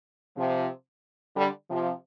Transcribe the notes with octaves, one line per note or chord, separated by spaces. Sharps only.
C3 F3
D3 G3
C3 F3